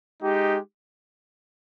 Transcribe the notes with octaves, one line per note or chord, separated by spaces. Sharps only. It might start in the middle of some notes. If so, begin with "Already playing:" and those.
G#3 D#4 G4